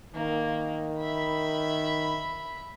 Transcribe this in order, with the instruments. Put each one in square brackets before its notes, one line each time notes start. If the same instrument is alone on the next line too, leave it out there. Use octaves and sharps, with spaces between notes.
[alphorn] D#3 [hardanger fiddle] A#3
[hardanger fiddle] E5 B5